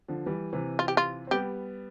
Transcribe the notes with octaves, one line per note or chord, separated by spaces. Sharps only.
D3 F3
E3 G3
C3 E3
F4
G4
F4
C4
G3 B3 G4